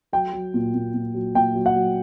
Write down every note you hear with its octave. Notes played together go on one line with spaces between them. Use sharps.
F#3 G5
F#3
A#2
A#2
A#2
F#3
A#2 G5
F#3
F#5
F#3